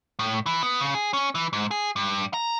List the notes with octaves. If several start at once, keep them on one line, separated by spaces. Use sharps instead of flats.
A2
E3
B3
C#3
G#4
C#4
E3
G#2
G#4
G2
A#5